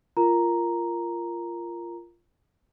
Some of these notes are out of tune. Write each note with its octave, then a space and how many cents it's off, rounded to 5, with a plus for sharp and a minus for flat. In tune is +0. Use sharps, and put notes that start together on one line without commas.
F4 -15 A#4 +0 A#5 +0